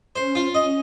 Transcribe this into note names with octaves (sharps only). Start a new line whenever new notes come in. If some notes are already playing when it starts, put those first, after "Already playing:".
C#4 C5
F4
D#5